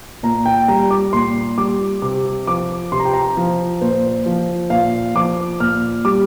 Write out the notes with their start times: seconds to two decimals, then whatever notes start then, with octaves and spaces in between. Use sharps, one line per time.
0.23 A#2 A#5
0.46 G5
0.68 G3 A#5
0.91 D6
1.13 A#2 C6
1.58 G3 D6
2.02 C3 D6
2.47 F3 D6
2.92 C3 C6
2.99 A#5
3.05 G5
3.13 A#5
3.37 F3
3.81 A#2 C5
4.26 F3
4.70 A#2 F5
5.15 F3 D6
5.60 A#2 F6
6.05 G3 D6